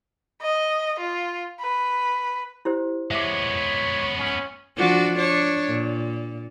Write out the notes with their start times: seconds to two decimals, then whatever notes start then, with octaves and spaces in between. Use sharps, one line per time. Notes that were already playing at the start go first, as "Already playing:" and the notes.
0.41 D#5
1.00 F4
1.61 B4
2.65 E4 G4 C5
3.11 G#3 B3 C#5 E5 D6
4.18 C#4
4.77 F3 D4 F#4
5.17 D4 C#5
5.68 A#2